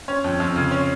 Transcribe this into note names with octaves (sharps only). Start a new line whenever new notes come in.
C#4
F2
F2
C#3
C#4